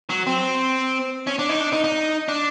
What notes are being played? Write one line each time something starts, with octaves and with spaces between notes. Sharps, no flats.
F#3
C4
C#4
D4
D#4
D4
D#4
D#4
D4